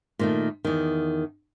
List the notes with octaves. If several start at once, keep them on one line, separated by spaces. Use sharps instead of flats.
A#2 D#3 A3
E2 D#3